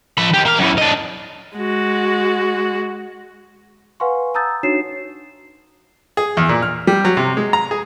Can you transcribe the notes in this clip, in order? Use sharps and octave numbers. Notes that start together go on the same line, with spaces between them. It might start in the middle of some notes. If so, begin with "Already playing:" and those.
F3 B5
D#2 G4
A#3 F5
F#2 E3
D4 D#5
G#3 F#4
B4 F5 F#5 G#5 C6 C#6
A5 A#5 D#6 E6 G6 A6
D4 D#4 F#4 C#5 C7 E7
G#4
E2
A#2
F6
G3
F#3
C3
G#3
A#5
G#4